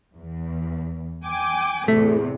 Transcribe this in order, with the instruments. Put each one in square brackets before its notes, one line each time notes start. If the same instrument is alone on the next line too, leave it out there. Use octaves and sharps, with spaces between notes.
[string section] E2
G5 G#5 D6
[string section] E2 A2 C3 [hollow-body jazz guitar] A3